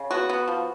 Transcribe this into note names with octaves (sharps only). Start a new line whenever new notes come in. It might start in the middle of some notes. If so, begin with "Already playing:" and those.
Already playing: C#3
B3 F#4
B3
F3